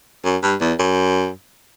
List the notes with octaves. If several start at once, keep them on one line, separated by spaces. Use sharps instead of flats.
F#2
G2
E2
F#2